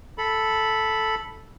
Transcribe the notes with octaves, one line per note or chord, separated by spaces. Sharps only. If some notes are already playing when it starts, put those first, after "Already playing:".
A4 B5